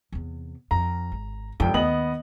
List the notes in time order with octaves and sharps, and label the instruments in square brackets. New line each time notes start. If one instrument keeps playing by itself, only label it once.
[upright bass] E2 C3
[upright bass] F2 [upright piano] A#5
[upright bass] G#1
[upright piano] F1 G5 [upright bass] F2 D#3
[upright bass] D#2 [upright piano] B3 D#5 F#7